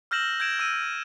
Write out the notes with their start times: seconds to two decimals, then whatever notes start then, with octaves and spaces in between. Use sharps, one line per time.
0.11 E6 F6 G6 A#6 E7 F#7
0.40 G6 G#6 D7 E7
0.59 E6 D#7